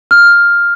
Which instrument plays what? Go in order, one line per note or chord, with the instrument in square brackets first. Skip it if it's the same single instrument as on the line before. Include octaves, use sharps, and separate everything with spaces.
[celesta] F6